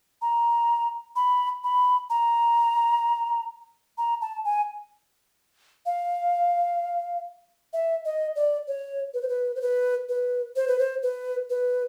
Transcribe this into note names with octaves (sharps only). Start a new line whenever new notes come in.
A#5
B5
B5
A#5
A#5
A5
G#5
F5
E5
D#5
D5
C#5
B4
C5
B4
C5
B4
B4
C5
B4
C5
B4
B4